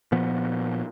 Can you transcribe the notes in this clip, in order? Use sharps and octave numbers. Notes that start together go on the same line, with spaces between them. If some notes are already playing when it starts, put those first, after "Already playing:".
A#2 F3 B3